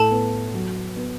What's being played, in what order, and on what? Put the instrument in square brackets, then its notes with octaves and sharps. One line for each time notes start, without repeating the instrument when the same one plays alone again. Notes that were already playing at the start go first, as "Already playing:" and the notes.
Already playing: [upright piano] A2 [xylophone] A4 A5
[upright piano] B3
F#3
B3